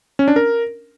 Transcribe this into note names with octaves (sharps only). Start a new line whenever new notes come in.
C#4
D4
A#4